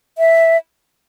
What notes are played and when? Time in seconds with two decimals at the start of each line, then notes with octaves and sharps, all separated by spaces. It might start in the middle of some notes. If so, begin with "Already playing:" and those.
0.18 E5